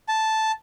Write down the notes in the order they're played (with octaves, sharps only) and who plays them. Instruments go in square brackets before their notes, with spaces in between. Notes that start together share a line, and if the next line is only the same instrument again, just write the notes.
[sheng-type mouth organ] A5